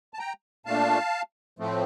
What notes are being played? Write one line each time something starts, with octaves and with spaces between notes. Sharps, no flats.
A5
G5 A#5
A#2 A3 D4 F5 A5
A2 F3 A3 C4